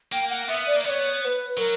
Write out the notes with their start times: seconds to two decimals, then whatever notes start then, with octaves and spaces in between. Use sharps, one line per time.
0.12 A#3 G5
0.30 F#5
0.48 B3 E5
0.67 D5
0.76 A#3
0.85 B3 D5
0.89 C#5
1.21 C#5
1.25 B4
1.57 F#3 A#4